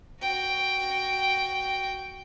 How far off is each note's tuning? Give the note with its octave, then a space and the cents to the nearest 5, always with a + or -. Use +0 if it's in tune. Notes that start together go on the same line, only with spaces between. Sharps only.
F#4 +10 G5 +0